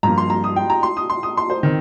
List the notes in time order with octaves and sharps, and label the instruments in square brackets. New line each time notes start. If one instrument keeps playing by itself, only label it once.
[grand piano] G2 F3 A#3 [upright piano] A#5
[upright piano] C6
A#5
D#6
G5
A#5
C6
D#6
C6
D#6
C6
C5
[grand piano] D#3 C4